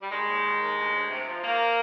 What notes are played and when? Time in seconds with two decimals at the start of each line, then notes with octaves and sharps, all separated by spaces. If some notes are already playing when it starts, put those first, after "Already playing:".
0.01 G3
0.11 D#3 G#3
0.28 D#2
0.45 D#3
0.61 D#2
0.77 D2
0.94 D2
1.10 C3
1.27 F3
1.43 D#3 A#3